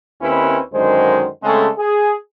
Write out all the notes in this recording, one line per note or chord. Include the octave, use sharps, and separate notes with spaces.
D#2 D#3 C4 C#4 E4 B4
F#2 D3 D#3 G#3 C5
C#3 G#3 A3 C4 A4
G#4